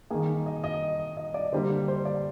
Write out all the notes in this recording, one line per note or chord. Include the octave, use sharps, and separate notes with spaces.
D#3 A#3 G#4
D#5
D#5
D#5
D5
D3 G3 A#3 C5
C5
D5